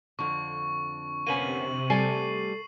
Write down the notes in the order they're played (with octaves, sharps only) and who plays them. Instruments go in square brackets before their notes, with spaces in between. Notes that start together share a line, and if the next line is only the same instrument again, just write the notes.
[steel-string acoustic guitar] F2 D3 [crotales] C#6
[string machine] C3 [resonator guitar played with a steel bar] A#3 B3 C#4 [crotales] D#7 F#7
[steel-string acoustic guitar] G3 A3 [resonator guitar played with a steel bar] A4 G#5 [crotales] C7